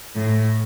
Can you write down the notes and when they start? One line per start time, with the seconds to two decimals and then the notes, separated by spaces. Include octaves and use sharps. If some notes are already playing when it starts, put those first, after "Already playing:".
0.15 A2